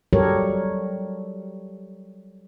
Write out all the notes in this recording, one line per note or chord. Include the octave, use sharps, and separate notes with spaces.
F#3 G3 G4 A4 A#4 C#5